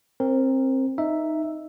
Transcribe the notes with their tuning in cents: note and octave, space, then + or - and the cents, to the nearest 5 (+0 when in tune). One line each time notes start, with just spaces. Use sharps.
C4 +20 A#4 +0
D#4 +0 E5 +0